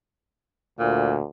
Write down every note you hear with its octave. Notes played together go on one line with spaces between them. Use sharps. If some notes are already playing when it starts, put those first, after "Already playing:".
D2 A#2